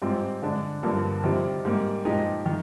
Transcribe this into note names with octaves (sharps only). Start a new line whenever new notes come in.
G#2 G3 C4 F4
D3 G#3 D4
G2 D3 F3 A#3
C3 D#3 G3 C4 F4
G#2 G3 A#3
A#2 F3 G#3 D#4 G4
D#3